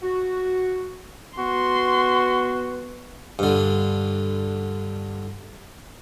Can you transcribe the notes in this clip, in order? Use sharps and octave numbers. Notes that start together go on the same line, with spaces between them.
F#4
B3 F#4 C6
G2 D3